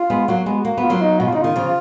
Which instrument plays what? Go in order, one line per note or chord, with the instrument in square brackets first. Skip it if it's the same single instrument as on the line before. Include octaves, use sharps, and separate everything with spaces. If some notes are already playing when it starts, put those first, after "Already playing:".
Already playing: [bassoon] F4
[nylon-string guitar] G#3 B3
[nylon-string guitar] F#3 A#3 [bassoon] F#4
[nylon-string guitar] G#3 B3
A#3
B3
[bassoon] F4
[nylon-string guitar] F#3 A#3
[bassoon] D#4
[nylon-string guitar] B2 [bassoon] F#4
[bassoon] F4
[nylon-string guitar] C#3 [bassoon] D#4
[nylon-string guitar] D#3 [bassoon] F4
[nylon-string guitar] C#3 F3